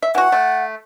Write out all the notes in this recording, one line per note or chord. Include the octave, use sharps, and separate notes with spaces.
E5
E3 F#4 F#5
A3